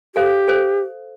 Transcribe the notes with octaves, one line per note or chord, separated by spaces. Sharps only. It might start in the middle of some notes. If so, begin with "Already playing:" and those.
G4 A4 C5 F5
A4 C5